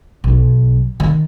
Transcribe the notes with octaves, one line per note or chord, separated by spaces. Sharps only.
B1
D#3